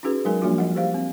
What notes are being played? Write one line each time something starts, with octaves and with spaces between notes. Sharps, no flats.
C#4 D#4 F#4 G#4 B4
F#3 G#3 D#4 A#4 G#5
F3 G3 A#3 D4 F4 F#4
D#5 F#5
G4 C5 F5
C4